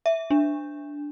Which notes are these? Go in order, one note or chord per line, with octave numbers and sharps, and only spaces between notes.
E5
D4